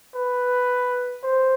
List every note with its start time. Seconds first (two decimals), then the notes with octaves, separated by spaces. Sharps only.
0.15 B4
1.24 C5